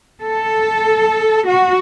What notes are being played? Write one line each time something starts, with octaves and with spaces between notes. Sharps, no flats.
A4
F#4